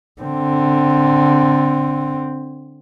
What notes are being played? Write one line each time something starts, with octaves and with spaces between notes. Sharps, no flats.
D3 C4